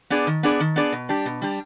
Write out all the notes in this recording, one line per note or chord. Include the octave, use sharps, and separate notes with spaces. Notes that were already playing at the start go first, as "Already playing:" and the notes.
B3 D4 G#4 D5
D#3
B3 D4 G#4 D5
D#3
B3 D4 G#4 D5
B2
G3 D4 G4
B2
G3 D4 G4